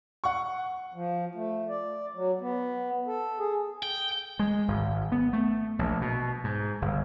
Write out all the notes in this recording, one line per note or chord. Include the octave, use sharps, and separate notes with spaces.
F#5 C#6
F3
A3
D5
F#3
B3
A4
G#4
G5
G#3
G#1
B3
A3
A#1
B2
G#2
G1